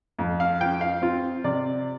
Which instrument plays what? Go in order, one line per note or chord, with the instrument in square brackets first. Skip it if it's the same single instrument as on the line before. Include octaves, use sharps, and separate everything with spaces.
[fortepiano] F2
F5
F3 G5
F5
C4 F4
C3 D5